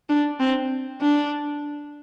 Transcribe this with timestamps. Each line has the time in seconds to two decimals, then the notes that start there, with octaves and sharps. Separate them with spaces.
0.09 D4
0.40 C4
1.01 D4